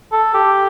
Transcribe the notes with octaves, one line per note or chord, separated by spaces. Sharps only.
A4
G4